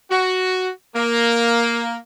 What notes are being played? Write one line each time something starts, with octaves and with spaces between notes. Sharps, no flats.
F#4
A#3